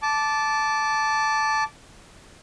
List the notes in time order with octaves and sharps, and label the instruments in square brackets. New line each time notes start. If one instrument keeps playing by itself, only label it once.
[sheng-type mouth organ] A5 D6